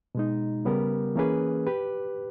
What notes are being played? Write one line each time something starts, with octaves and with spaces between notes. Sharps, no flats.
B2 G#3 D#4
C#3 G3 B3 G4 A#4
E3 A#3 C#4 G#4 B4
G4 B4